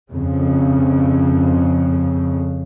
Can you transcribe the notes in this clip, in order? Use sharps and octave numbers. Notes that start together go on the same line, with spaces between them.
F2 C#3